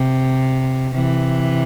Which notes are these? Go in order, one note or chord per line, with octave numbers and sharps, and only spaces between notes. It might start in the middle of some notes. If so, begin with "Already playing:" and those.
Already playing: C3
C3 E3